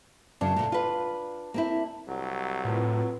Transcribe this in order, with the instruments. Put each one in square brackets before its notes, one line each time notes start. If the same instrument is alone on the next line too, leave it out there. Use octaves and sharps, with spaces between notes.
[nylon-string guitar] F#2 C#3 [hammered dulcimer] D4
[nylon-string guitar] D2 A#2
F4 B4
A#3 C4 E4
[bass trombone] C2 [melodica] F#3
[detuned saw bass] A2 [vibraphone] C4 F4 B4